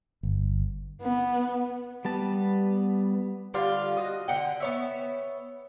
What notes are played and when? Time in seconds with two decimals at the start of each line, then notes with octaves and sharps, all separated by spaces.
0.23 G1
1.02 B3
2.05 G3 B3 A5
3.54 D3 G3 F4 F5
3.97 F#4 D#5
4.28 D3 F#5 G5
4.60 B3 C#5 E5